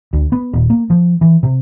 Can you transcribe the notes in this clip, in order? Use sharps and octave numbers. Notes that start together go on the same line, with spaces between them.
D2
B3
D#1
A#3
F3
E3
C3